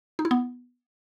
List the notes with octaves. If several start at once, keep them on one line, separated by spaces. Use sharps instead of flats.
D#4
E4
B3